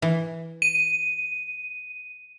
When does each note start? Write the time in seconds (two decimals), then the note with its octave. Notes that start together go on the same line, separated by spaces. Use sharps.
0.02 E3
0.62 D#7